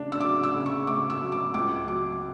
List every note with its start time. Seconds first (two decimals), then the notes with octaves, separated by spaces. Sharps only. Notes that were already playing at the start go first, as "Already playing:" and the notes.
Already playing: C#3 D4
0.12 E6
0.20 F#3 D6
0.43 E6
0.54 C#3
0.66 C#6
0.87 A3 D6
1.10 E6
1.21 F#3
1.32 D6
1.54 C#2 D6
1.87 F#3 D6